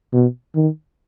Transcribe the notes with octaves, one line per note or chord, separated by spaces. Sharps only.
B2
D#3